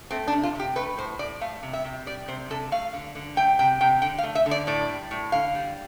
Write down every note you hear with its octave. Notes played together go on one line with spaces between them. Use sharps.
A3 C4
D4
C3
F4
C3 G4
A3 B4
A2 C5
A2 D5
A3 F5
C3
E5
C3
G3 D5
C3 C5
C3 A4
A3 F5
D3
D3
A3 G5
C3 G5
C3 G5
D3 G5
F5
A3
E5
D3
D5
A2 D5
G3
A2
D3 F5
G3